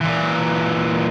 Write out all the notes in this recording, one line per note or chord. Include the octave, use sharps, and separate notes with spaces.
A#2 E3